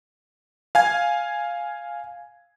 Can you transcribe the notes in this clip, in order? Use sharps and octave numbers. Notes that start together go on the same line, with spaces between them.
F5 G#5 G#6